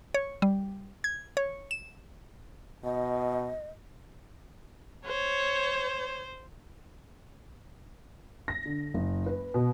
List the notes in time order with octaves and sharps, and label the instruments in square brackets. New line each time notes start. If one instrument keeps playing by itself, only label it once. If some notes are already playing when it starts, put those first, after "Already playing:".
[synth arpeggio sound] C#5
G3
G#6
C#5
E7
[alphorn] B2 [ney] D#5
[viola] C5 [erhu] C#5
[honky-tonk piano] A#6
D3
F#1
B4
B2